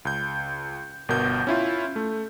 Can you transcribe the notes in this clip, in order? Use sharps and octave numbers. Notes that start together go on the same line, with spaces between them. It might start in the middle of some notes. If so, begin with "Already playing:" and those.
C#2 G6
G1 B2 A#4 G6
C#4 E4 F4
A3